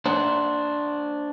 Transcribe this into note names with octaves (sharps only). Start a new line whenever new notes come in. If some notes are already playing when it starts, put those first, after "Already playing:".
D4 C5 F#5